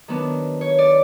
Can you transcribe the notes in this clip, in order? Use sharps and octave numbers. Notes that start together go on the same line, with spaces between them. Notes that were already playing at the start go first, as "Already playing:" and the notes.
D#3 F#3 B3 D4
C#5
D5